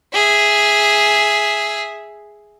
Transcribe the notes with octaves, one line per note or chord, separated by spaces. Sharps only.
G#4 E5